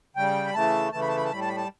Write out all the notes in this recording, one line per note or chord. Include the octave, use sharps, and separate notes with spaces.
C#3 G3 G5
B5
C#3 E3 A3 A5
C#3 E3 A3 A5
B5
A5
B5
A5
A2 G3 B5
A5
B5
A5